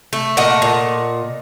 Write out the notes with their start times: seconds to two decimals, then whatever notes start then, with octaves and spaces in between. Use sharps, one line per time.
0.13 A3
0.37 A#2 D#5 F#5
0.62 A#2